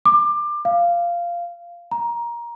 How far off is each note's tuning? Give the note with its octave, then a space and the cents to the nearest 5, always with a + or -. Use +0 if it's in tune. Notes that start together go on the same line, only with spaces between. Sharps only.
D6 +25
F5 -10
A#5 +20